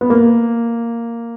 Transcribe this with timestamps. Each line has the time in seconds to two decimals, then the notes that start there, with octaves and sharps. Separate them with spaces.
0.01 B3
0.10 A#3